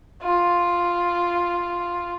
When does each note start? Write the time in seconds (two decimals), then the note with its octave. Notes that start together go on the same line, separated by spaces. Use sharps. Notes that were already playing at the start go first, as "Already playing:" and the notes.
0.22 F4